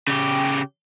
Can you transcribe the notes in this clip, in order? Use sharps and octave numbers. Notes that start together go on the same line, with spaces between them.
C#3 G4